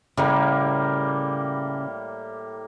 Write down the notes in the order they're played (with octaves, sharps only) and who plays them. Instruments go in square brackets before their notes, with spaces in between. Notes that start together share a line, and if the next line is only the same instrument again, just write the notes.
[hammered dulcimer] A2 G3 A#3 [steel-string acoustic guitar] C#3